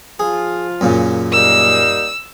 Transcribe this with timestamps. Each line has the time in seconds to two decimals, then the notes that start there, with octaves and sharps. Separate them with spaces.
0.20 F3 F4 G#4
0.81 F#2 A#2 C#3
1.32 G3 A#3 D#4 E6